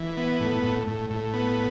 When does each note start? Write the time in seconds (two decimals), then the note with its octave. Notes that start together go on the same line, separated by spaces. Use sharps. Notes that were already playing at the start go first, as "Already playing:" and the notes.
Already playing: E3
0.17 B3
0.40 A2
0.63 A2
0.87 A2
1.10 A2
1.34 B3